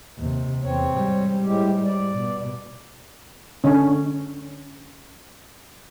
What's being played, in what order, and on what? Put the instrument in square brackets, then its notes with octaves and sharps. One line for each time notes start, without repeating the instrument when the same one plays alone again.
[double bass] D#2 C3
[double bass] E2 [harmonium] C4 C#5
[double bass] G#2 G3
[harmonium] A2 G#3 G4
D5
[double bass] B2
[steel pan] D3 C#4